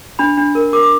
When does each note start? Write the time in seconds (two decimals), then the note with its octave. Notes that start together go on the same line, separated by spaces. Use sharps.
0.19 D4 B5
0.37 D4
0.55 A#4
0.73 A#4 D6
0.83 D6